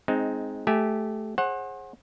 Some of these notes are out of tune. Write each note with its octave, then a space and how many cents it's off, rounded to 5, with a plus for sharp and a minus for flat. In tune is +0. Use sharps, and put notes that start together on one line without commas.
G#3 +15 C4 +0 D#4 +0
A3 -15 G4 +0 G#5 +0
G#4 +0 C5 +40 F#5 +0